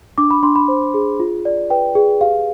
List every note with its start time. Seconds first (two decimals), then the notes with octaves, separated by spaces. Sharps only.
0.18 D4 D6
0.31 B5
0.43 D4 C6
0.55 B5
0.68 C5
0.94 G#4
1.20 F4
1.45 D5
1.70 B4 G5
1.95 G#4
2.21 G4 F5